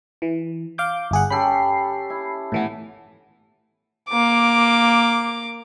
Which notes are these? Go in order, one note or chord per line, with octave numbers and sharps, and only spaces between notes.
E3
F5 D6 G6
G1 G#4 F#5
C#4 G4 A4 B5 C7
E4
A2 E3 B3
A#3 D6